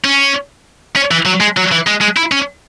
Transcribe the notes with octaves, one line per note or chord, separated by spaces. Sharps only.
C#4
C#4
E3
F#3
G#3
F#3
E3
G#3
G#3
E4
C#4